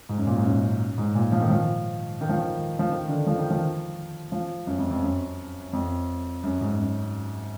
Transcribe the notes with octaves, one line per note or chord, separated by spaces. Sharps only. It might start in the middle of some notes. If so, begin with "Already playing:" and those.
G#2
F#2
A#2
G#2
F#2
G#2
A#2
F3
D#3
F3
D#3
F3
D#3
F3
D#3
D3
F3
D#3
F3
F3
F#2
F2
F2
F#2
F2
F#2
G#2
F#2